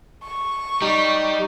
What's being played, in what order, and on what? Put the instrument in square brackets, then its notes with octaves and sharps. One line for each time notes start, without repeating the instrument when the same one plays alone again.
[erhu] C#6
[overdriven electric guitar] G3 [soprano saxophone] D#4